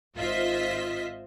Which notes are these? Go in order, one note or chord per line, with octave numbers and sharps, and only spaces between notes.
G#1 F4 C5 D#5 E5 B6